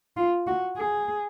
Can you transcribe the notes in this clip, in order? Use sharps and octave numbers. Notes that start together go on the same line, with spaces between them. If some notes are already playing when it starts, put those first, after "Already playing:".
F4
F#4
G#4